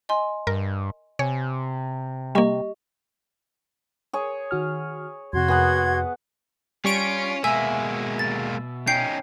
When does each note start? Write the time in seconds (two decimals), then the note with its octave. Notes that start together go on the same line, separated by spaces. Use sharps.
0.09 D#5 G#5 C6
0.47 G2 A#4
1.19 C3 C#5 G#5
2.35 G3 A#3 G4 D#5 C#6
4.13 G#4 C#5
4.51 D#3 F#4 F6
5.33 F2 C3 F#4 C6 G#6
5.48 B3 G#4 F#5
6.85 G3 C#4 F4 C#6 D7
7.44 B2 G#3 A#3 E5 G#5
8.19 A6
8.87 C#4 D#4 G5 G6 C7